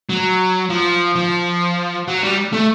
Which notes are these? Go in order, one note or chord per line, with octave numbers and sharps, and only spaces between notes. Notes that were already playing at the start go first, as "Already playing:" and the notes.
F#3
F3
F3
F#3
G3
A3